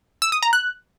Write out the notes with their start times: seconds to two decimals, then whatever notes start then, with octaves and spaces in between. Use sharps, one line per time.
0.22 E6
0.32 D#6
0.43 A#5
0.53 F#6